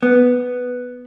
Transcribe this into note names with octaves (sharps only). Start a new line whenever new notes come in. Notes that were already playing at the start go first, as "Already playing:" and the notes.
B3